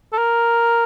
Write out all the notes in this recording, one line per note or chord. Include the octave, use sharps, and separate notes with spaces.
A4
A#4